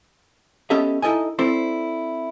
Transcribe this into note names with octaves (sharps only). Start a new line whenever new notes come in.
B3 C#4 G4 A4 D#5 E5
D#4 E4 A4 D#5 G#5
C4 E4 A4 C5 D5